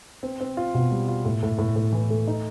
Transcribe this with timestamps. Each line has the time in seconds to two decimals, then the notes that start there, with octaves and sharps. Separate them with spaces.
0.23 C4
0.41 C4
0.57 F4
0.74 B2
0.91 G3
1.08 F4
1.25 A2
1.43 A2
1.59 A2
1.76 A2
1.93 E3
2.10 A3
2.27 D#4